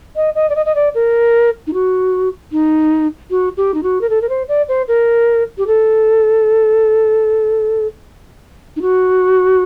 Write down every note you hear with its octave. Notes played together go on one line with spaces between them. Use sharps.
D#5
D#5
D5
D#5
D#5
D5
A#4
D#4
F#4
D#4
F#4
G4
D#4
F#4
A#4
A4
A#4
C5
D5
C5
A#4
G4
A4
D#4
F#4